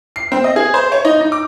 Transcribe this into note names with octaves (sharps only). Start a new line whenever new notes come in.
C7
C4
D#5
G#4
C5
C#5
D#4
D#4
D6